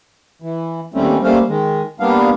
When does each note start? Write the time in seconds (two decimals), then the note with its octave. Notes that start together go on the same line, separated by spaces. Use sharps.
0.42 E3
0.94 D#2 G3 A3 C4 C#4
1.23 G3 A3 A#3 C#4 C5 F5
1.49 D#3 G#3
2.00 G3 A#3 B3 D4 F5